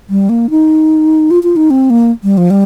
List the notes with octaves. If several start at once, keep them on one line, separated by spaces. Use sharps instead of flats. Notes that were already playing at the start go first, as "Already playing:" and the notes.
G3
A#3
D#4
F4
F4
D#4
C4
A#3
G3
F3
G3